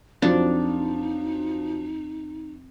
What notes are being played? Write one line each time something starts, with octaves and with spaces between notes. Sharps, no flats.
F2 F3 F#3 D4 D#4